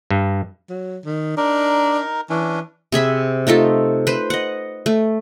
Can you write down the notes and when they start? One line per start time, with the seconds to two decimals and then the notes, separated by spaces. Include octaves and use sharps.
0.11 G2
0.70 F#3
1.05 D#3
1.37 D4 D#4 A#4
2.30 E3 C#4 D4
2.92 C3 G#4 E5 B5
3.47 A3 D#4 F4 A4
4.07 B4 C5
4.30 D#5 F#5
4.86 A3